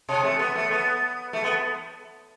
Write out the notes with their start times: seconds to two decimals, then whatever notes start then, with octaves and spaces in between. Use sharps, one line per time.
0.09 C3
0.23 A3
0.39 B3
0.55 A3
0.71 B3
1.33 A3
1.44 B3